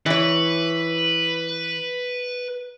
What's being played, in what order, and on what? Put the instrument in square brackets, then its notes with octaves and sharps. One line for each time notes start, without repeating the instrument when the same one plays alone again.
[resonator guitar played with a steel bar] E3 C#5 [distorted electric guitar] B4